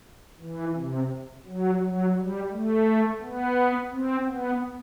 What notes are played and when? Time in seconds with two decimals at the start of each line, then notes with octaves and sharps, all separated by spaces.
0.40 E3
0.75 C3
1.46 F#3
1.81 F#3
2.15 G3
2.51 A3
3.22 B3
3.91 C4
4.26 B3